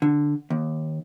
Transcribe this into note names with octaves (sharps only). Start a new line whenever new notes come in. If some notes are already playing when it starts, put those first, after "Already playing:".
D3
D#2